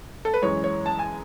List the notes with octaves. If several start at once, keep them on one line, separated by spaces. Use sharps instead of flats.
A4
B4
F#2 E3 G#3 C#5
C#5
A5
G#5